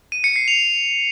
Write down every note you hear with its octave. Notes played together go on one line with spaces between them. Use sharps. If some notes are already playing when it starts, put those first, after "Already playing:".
D#7
C#7
C7
F7